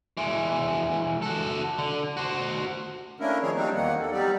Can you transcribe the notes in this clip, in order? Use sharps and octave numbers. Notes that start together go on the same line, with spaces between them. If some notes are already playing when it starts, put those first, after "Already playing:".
E3 G#3
F#4 A4
D3
F#4 C5
A3 A#3 C#4 D4 E4 A#4
D#3 F3 C4 G#4 C#5
F#3 G3 A#3 C4 D4 D#4
E2 D#3 A#3 F#5
A4
F#3 G3 B3 D#4 G4 D5